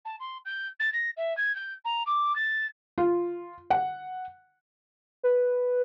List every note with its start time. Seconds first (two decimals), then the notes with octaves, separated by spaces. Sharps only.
0.05 A5
0.19 C6
0.45 G6
0.79 A6
0.92 A#6
1.16 E5
1.37 G#6
1.55 G6
1.84 A#5
2.06 D6
2.35 A6
2.98 F4
3.70 F#5
5.23 B4